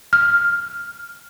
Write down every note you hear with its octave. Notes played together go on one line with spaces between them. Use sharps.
F6